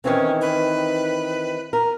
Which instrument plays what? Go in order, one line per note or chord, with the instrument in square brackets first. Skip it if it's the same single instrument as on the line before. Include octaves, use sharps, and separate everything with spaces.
[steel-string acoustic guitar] D#3 E3 C4 [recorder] C#4
[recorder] B4
[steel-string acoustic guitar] A#4